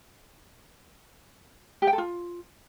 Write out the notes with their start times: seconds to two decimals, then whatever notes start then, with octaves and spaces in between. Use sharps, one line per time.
1.82 G4
1.87 G5
1.93 A4
1.98 F4